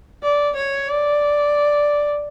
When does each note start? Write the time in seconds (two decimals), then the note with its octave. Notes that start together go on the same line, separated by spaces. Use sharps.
0.23 D5
0.56 C#5
0.89 D5